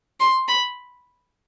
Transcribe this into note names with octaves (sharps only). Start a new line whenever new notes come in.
C6
B5